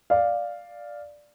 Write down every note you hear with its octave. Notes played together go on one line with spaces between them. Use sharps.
D5 F5